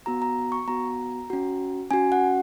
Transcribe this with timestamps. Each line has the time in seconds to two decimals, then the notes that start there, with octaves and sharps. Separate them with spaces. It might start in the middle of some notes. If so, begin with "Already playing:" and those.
0.06 B3 F#4 A#5
0.22 A#5
0.52 C#6
0.68 B3 F#4 A#5
1.30 C#4 F#4
1.91 C#4 F#4 G#5
2.12 F#5